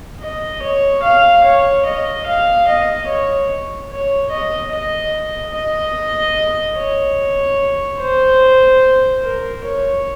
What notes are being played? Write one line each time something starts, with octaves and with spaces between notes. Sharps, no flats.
D#5
C#5
F5
C#5
D#5
F5
D#5
C#5
C#5
D#5
D#5
D#5
C#5
C5
A#4
C#5